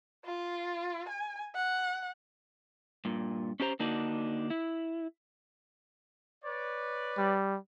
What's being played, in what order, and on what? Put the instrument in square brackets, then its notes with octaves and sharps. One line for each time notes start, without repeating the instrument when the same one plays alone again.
[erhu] F4
G#5
F#5
[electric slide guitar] G2 A#2
C#4 D4 G4 C5 A#5
D3 A#3 D4 D#4 F#4
E4
[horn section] B4 C#5 D5
[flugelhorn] G3